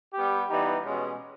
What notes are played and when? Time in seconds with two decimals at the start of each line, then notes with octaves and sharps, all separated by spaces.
0.14 G3 B3 G4
0.49 E3 G3 B3 D#4 G4
0.85 B2 G#3 C#4